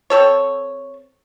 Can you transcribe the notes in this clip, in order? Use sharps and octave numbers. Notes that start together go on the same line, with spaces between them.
C4 A4 C#5